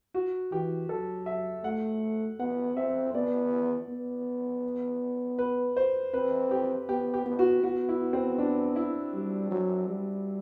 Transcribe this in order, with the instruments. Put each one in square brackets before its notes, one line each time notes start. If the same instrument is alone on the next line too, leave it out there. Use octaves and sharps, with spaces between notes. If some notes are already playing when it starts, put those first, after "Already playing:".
[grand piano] F#4
[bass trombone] E3 [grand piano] G4
[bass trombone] F#3 [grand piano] A4
[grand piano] E5
[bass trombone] A3 [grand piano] F#5
[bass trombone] B3 [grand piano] F#5
[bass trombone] C4 [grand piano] E5
[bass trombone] B3 [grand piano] D5
[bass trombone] B3
[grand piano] B4
C5
[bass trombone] C4 [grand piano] B4
[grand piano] G4
[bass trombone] B3 [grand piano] G4
[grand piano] G4
[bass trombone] B3
[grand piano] F#4
[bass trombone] B3 [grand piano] F#4
[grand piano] E4
C4
D4
E4
[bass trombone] G3
F#3
G3